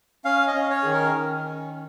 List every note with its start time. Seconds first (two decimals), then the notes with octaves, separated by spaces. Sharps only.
0.25 C#4 F5
0.47 D#5
0.55 C#4
0.70 C#5
0.83 D#3 G#4
0.93 A#4
1.15 D#3
1.44 C#4